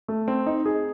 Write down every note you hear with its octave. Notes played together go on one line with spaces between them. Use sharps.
A3
C4
D#4
G#4